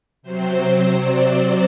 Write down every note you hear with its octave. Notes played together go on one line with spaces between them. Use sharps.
C3 F#3 C4 C5
D5